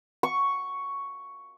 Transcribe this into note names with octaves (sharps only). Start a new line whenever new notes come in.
C#6